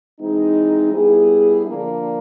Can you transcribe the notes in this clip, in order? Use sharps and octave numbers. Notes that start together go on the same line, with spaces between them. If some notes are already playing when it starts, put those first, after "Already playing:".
E3 G#3 C4 D#4
G3 B3 E4 G#4
D3 F3 A#3 D4